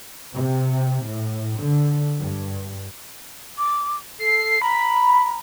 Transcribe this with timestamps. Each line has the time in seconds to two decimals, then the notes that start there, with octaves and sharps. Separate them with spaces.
0.34 C3
1.06 A2
1.61 D3
2.20 G2
3.58 D6
4.19 A4 C7
4.62 A#5 B5